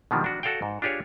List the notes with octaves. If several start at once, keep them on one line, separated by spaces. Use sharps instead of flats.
B2 D3 D#3 F3 G3 G#3
D4 F#4
F#4 A4 D5 F5 G5
G#2
D4 F4 G4 G#4 C#5